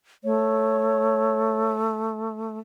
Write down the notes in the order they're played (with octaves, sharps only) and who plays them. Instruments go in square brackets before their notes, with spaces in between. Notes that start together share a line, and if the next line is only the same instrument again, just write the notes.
[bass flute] A3 [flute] C#5